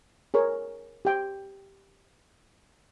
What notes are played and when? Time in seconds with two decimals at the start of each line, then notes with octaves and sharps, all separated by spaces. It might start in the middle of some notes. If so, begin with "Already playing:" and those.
0.34 G#4 A#4 C#5
1.05 G4 G5